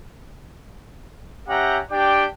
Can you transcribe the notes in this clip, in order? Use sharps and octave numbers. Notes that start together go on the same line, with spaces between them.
C#4 G4 E5 F#5 G5 A#5
D4 G4 D5 G5